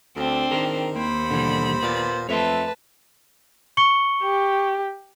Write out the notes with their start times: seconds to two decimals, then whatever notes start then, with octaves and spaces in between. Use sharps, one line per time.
0.16 D2 C4 D4
0.51 D#3 G#4 A#4 C5
0.96 D#2 A#3 C5 B5
1.31 B2 D3 E3 G3
1.83 A#2 B3 D5
2.29 F2 A3 B4 C#5 E5 A5 C6
3.77 C#6 C#7 G7
4.23 G4